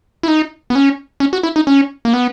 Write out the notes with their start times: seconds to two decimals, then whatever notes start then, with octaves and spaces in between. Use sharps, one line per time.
0.23 E4
0.28 D#4
0.70 B3
0.75 C#4
1.20 C#4
1.33 F#4
1.43 E4
1.56 D#4
1.67 C#4
2.05 A#3
2.13 B3